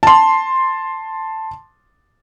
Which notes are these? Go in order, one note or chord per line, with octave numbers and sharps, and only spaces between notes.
A5 C6